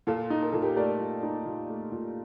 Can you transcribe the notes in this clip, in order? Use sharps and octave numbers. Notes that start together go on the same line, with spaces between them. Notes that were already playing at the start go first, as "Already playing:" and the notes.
A#2 F4 A4
D#4
A#4
A#2 A4
G4 A#4
A3 A#4 D5
A#2
D#4
A#2
A3
A#2